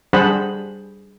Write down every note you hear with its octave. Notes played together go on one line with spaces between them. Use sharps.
G3 D4 G#4 C5 F#5 B5